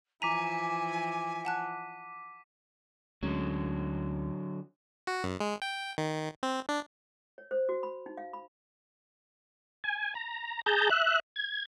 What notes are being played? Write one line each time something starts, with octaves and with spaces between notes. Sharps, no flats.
E3 F3 G#5 A#5 D6 B6 D#7
F#5 A5 F#6
D2 D3 F#3 G#3 C#4
F#4
F#2
G#3
G5
D#3
C4
D4
C#5
C5
F#4
B5
D#4
F5
B5
G#5
A#5
G#4 A5 A#5 G6
E5 F#6
G#6